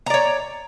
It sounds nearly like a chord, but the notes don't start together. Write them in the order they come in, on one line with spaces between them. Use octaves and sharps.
A#5 D5 C#5